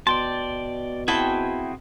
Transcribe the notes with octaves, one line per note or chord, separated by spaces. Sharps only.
B2 D5 G5 A5 C6
C4 E4 F#4 G#4 G5 A5